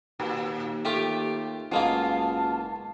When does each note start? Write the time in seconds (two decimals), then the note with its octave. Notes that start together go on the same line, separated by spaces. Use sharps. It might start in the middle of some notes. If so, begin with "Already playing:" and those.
0.20 D#2 A#2
0.85 A3 F4 G4
1.72 F#1 B2 G#3 A#3 F4 A5